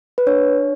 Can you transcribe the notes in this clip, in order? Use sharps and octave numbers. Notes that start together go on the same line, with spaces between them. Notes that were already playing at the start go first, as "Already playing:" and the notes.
B4
D4 C#5